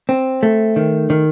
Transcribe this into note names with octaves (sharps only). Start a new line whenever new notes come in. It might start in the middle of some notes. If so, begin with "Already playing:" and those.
C4
A3
D#3
D#3